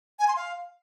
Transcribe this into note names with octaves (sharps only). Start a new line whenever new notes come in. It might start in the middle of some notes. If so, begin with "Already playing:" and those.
G#5
C6
F5